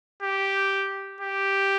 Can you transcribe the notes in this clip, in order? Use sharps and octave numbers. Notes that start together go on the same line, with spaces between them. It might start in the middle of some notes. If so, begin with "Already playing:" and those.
G4
G4